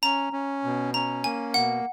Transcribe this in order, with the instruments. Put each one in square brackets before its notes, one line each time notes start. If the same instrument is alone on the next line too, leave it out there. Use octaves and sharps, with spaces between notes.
[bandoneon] C#4 [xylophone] A#5
[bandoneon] C#4
B2
[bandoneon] C#4 [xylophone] A#5
[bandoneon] A#3 [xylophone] G#5
[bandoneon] B2 [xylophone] F#5